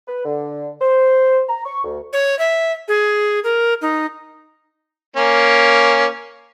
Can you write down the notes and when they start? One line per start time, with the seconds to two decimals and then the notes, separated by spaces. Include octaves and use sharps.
0.07 B4
0.24 D3
0.81 C5
1.48 A#5
1.64 C#6
1.84 D2
2.13 C#5
2.39 E5
2.88 G#4
3.44 A#4
3.82 D#4
5.16 A#3 C#4